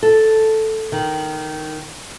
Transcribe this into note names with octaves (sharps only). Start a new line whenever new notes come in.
A4
D#3